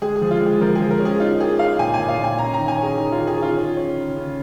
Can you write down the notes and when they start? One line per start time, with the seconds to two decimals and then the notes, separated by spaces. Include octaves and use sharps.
0.02 G#3 G#4
0.16 G#4
0.21 F3
0.31 F4
0.40 G#3
0.46 G#4
0.61 F3 A#4
0.75 F3 G#4
0.90 A#4
1.00 C#4
1.05 G#4
1.20 D#4 F4
1.39 A#3 G#4
1.59 D#4 F5
1.79 A#2 G#5
1.94 A#2 G#5
2.09 F5
2.18 A#2
2.24 G#5
2.38 C#4 A#5
2.54 D#3 A#5
2.68 G#5
2.78 C#4 G#4
2.98 D#3 G#4
3.12 F4
3.17 D#3
3.27 G#4
3.37 C#4
3.42 F4
3.57 C#4
3.77 C#4
3.97 C#3
4.16 C#3